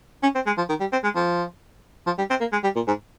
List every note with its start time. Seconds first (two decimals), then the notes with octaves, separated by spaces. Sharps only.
0.23 C#4
0.35 C4
0.46 G#3
0.58 F3
0.69 D#3
0.80 G3
0.92 C4
1.04 G#3
1.16 F3
2.07 F3
2.18 G3
2.30 C4
2.41 A#3
2.53 G#3
2.64 G3
2.76 A#2
2.88 G#2